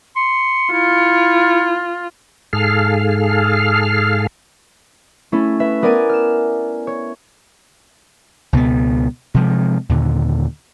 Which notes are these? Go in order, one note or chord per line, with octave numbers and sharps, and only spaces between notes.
C6 C#7
E4 F4
G#2 G#4 A4 F5 F6
A3 C#4 E4
B4 E5
B3 A#4 D5 G#5 D7 D#7
F6 E7
C#5
C#2 B2 F3 B3
C3 F3 G#3
D#2 A#2 D3